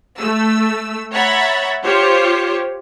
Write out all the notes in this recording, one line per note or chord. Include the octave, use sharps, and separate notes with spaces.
A3 E6
C#5 E5 F#5 A#5 B5 A6
F4 G4 C5 C#5